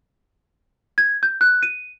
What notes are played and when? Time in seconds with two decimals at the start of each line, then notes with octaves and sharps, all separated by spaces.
0.98 G#6
1.23 G6
1.41 F#6
1.63 D#7